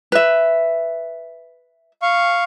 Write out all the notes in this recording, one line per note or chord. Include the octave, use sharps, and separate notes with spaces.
B4 E5
F5 C#6